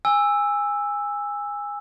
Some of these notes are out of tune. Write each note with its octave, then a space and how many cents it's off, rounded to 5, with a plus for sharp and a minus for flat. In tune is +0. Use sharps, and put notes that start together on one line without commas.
G#5 -20 E6 +0